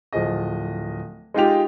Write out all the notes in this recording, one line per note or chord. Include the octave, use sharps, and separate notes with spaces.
D1 F3 G#4 D#5
G#3 D#4 F4 G4 F7